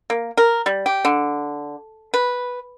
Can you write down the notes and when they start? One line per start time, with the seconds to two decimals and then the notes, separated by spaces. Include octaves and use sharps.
0.10 A#3
0.37 A#4
0.66 G3
0.86 G4
1.05 D3
2.14 B4